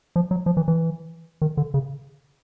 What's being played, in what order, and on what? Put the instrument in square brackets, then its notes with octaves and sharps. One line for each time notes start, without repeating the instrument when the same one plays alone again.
[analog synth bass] F3
F#3
F3
E3
E3
D#3
D3
C#3